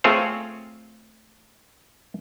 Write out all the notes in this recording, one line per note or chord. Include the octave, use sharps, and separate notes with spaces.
A3 C4 F4 G#4 C5 C#5